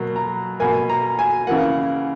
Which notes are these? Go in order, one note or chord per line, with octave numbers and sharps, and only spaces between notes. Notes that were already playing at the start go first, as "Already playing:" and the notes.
Already playing: B2 F#3 A#3
A#5
B2 A#3 G#5
A#5
G#5
C#3 E3 A#3 F#5